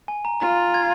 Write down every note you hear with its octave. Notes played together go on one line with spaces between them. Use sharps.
G#5
A#5
F4 A#5
G#6